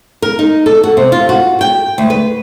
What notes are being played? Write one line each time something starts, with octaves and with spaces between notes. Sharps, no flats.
A#4
D#4
A4
F#4
C3
F4
F#4
G5
D2
B4